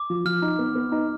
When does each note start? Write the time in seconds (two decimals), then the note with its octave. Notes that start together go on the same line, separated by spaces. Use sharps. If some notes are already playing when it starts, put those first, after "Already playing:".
Already playing: D6
0.10 F3
0.25 F3 F6
0.42 D#4
0.59 B3
0.75 B3
0.92 D#4